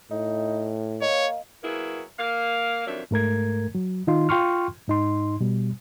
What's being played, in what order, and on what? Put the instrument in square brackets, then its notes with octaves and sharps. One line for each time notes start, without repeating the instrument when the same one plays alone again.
[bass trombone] A2 [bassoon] D#4
[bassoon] A#3 [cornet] C#5 [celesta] D#5 F5
[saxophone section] F#3 A#3 B3 E4 G#4
A#3 F5
F2 D#3 F#3 D4 E5
[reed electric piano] G#2 A3 A#4 G#6
F#3
D#3 D#4 F4 C6
F4 G5 C6 C#6 F6
G#2 D#4 C6
B2 G3